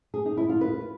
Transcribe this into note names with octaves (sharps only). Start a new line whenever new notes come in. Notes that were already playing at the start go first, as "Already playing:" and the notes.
G#4
D#4
E4
F4
B4